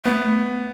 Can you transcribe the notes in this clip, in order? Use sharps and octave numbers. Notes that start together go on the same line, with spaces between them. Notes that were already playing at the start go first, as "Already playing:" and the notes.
A3 B3